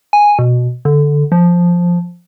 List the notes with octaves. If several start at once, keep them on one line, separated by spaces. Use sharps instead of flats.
G#5
B2
D3
F3